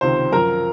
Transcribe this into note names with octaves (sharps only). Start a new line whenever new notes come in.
C#2 C3 D#3 C5
F#2 F3 A#4 A#5